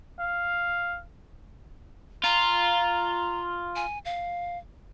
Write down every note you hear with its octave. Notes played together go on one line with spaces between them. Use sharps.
F5
F4 A#5
G#5
F5